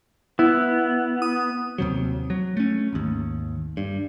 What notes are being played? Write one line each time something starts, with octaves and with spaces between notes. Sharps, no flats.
B3 E4
D#6
D#2 C3 F#3
F#3
A3 C#4
G#1 D#2
G2